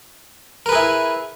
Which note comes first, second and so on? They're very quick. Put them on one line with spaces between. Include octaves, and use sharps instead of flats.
A#4 B4 G#4 E4